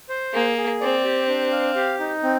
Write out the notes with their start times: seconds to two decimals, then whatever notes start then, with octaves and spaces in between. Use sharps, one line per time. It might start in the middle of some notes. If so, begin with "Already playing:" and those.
0.09 C5
0.33 A#3 G#4
0.58 G#4
0.81 C4 D5
1.04 G4
1.28 D4
1.52 F5
1.76 G4
2.00 D#4
2.23 C4